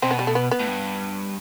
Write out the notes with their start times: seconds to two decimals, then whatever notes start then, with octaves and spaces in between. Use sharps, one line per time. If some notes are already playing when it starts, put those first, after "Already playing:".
0.02 B2 C4
0.11 B3
0.19 G3
0.27 A3
0.35 B3
0.51 B3
0.60 A2
0.68 G2